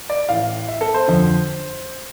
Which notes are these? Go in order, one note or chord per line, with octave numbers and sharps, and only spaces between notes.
D5
A2 E3 F5
E5
A4
C5
F2 D3